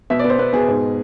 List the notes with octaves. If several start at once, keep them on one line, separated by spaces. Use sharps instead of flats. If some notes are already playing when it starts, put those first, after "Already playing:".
B2 E5
D5
B3
C5
B3 B4
B2 G#4
G#2